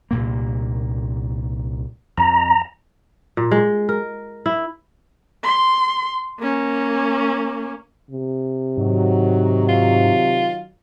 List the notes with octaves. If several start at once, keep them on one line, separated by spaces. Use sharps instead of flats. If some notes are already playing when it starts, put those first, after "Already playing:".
C2 A#2 A#3
F2 A#5
A#2
G#3
A#4
E4
C6
A#3 C#4
C3
G#2 D#3 F#3
F4